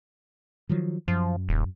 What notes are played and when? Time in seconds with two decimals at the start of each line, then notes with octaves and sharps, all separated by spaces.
0.69 D#3 F3 F#3
1.08 F#2 F3
1.49 D#1